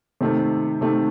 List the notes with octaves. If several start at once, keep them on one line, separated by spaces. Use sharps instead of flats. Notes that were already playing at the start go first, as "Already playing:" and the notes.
C3 D#3 A3
C3 D#3 A3